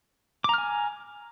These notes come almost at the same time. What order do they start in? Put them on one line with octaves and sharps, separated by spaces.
D6 A#5 F6 G#5